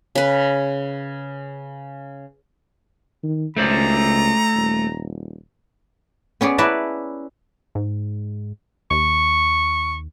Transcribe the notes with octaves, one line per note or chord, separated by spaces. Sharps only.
C#3 B4
D#3
C#2 A3 C5 D5 A#5
D#1
B3 C#4 G#4 D5
C#4 E4 B4 D5 A5 A#5
G#2
D#2 C#6